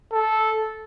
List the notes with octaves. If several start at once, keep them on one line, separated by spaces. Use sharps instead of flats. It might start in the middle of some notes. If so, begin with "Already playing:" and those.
A4